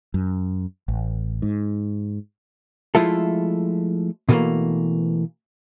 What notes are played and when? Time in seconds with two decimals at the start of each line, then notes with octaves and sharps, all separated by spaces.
0.14 F#2
0.88 A1
1.42 G#2
2.95 F3 G#3 A3 E4 F4 A4
4.29 B2 D3 E3 G3 A3 A#3